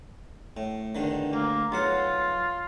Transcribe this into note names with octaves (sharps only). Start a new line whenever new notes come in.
A2
E2 D3 D#3
D2 A#3
B1 F#3 F4 F#5